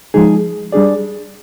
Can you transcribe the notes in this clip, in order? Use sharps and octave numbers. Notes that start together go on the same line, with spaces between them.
F3 G#3 D#4 G#4
G3 D4 G#4 D5